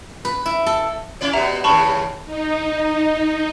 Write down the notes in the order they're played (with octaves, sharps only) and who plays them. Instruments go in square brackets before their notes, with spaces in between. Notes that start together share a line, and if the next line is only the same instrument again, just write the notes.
[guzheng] B4
E4
A4
[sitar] C#4 E4 D5
[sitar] B2 B3 [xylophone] G4 E5 A#5
[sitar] D#2 A2 C#3 [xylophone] A5 B5 C#6
[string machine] D#4